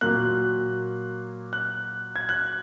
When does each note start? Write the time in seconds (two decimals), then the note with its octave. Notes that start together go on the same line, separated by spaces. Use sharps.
0.01 A#2 F#3 A#3 F#6
1.53 F#6
2.16 G#6
2.29 F#6